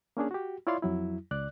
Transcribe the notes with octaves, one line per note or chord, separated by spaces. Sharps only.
A#3 C#4 D4 G#4
F#4 G4
E4 F4 C#5 D5 F5 C6
F2 F#3 E4
C#2 D5 F#6